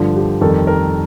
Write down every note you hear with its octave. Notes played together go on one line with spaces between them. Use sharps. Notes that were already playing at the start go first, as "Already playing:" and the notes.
Already playing: G2 D3 F3
G4
F2 D#3 G3 A4
A#4